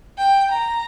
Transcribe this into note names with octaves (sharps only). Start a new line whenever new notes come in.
G5
A#5